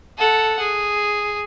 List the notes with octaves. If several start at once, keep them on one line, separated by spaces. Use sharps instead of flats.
A4 F#5
G#4